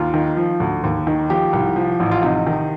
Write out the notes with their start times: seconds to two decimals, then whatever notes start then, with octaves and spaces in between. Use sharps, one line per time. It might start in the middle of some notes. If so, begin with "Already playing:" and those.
Already playing: D#2 F4
0.14 D#3
0.37 F3
0.60 D2
0.83 D#2
1.07 D#3
1.30 F3 G4
1.53 C2
1.76 F3
2.00 A1
2.11 F4
2.22 C3 D#4
2.47 D#3